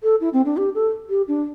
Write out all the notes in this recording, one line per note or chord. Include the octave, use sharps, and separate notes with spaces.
A4
E4
C4
D4
G4
A4
G4
D4